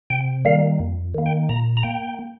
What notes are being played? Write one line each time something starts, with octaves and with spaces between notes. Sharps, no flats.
C3 G5
D#3 G3 A#3 F5
F2
D#3 A#3
G5
A#2 A#5
A#5
A#3 G5